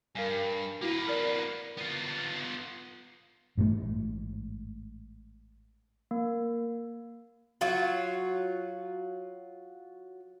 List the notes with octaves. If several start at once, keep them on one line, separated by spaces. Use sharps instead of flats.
G2 A#4 F5 G#5
A#3 E4 F#4 B4
A#4 D5
B3 F4
A1 G#2 C3 A3
A#3
F#3 F4 F#4